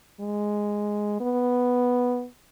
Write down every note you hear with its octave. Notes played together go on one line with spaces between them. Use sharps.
G#3
B3